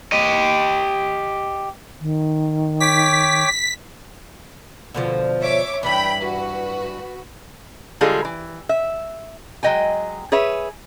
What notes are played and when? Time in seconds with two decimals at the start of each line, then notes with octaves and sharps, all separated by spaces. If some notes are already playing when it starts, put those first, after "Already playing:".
0.12 G4 D#5
2.00 D#3
2.80 C#5 G5 D6 B6
4.94 B2 D3 F3
5.41 C#5 E5 D6
5.83 G2 E3 D4 G5 B5
6.22 F#4 B4
8.01 D3 G3 G#3 F4 G#4 A4
8.25 E3
8.69 E5
9.63 F#3 G#3 D#5 G5 G#5
10.32 G#4 B4 C#5 E5